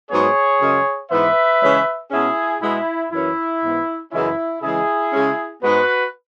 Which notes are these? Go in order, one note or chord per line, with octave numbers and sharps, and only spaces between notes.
G#2 F#3 B3 G#4 C#5
F#2 C#3 G#3
G#2 E3 B3 B4 E5
C#3 E3 G#3 C#4
B2 G#3 C#4 E4 G#4
B2 G#3 B3 E4
F#2 E3 C#4 E4
G#2 E3 B3
F#2 C#3 E3 G#3 C#4 E4
C#3 E3 G#3 E4 G#4
C#3 G#3 C#4
G#2 G#3 B3 F#4 B4